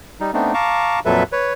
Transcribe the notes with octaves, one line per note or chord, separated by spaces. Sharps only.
G3 D#4
A3 B3 C4 D4 D#4
F5 A5 A#5 C#6 D6
F2 A#2 F#3 A4 B4 E5
B4 C#5